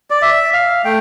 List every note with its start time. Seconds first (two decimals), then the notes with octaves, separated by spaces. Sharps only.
0.10 D5
0.22 E5
0.54 F5
0.85 A3 G5